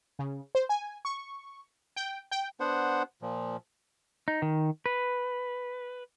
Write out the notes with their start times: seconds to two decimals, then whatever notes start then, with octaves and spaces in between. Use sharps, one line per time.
0.19 C#3
0.55 C5
0.69 G#5
1.05 C#6
1.96 G5
2.31 G5
2.60 B3 D4 C5 F#5
3.22 A#2 F3
4.28 D#4
4.42 D#3
4.86 B4